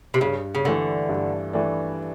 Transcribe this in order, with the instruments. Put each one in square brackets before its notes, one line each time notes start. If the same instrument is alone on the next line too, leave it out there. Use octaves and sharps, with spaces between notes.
[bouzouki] C3
[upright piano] G2 [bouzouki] C#3
[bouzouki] C#3
[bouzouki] D3 [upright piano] E3 A3 D4
[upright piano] G2
E3 A3 D4